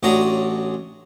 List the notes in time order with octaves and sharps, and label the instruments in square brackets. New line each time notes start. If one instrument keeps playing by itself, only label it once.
[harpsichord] A1 C#4 D4 F#4 A#5 D#6